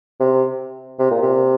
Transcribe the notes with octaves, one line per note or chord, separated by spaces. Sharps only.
C3
C3
A#2
C3